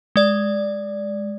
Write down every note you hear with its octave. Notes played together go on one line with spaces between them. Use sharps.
G#3 D5